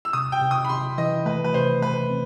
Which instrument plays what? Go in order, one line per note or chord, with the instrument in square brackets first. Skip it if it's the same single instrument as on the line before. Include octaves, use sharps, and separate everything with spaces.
[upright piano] E6
[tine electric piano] C3 [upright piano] D#6
[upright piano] G5
[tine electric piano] C3
[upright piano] D#6
B5
[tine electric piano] C3 [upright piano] C6
[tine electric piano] E3 [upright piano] D#5
[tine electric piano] A3 [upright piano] B4
[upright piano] B4
[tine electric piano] C3 [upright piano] C5
[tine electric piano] A3 [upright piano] B4
[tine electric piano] C4